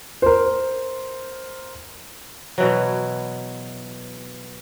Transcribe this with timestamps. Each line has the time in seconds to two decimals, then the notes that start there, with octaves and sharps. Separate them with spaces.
0.22 A#4 C5
2.58 B2 E3 F#3